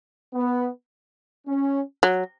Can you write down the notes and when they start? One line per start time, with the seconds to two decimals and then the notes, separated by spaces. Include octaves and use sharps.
0.34 B3
1.47 C#4
2.03 F#3